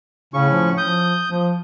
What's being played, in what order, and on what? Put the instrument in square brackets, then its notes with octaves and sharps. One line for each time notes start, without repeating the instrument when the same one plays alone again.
[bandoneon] A2 C#4 C#6 [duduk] C#3
[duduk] F3
[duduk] F3 [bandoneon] D#6 G6
[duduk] F3